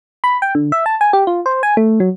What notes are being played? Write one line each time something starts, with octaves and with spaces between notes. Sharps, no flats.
B5
G5
D3
E5
A5
G#5
G4
F4
C5
G#5
A3
F#3